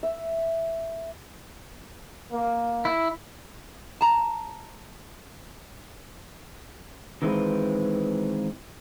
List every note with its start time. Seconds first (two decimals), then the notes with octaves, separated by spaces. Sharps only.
0.03 E5
2.32 A#3
2.85 E4
4.01 A5 A#5
7.22 D#3 E3 G#3 C4 F4 B4